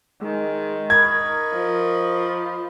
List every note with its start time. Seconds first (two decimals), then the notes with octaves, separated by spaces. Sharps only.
0.21 D#3 G#3
0.90 A#4 D#5 B5 C#6 G#6
1.53 F3